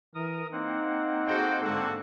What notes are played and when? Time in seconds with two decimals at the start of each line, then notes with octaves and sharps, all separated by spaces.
0.15 E3 A#4 D#6
0.52 A#3 C4 D#4 F#5
1.27 F#4 G#4 A4 C5 D#5 G5
1.62 G#2 D3 F#4 A4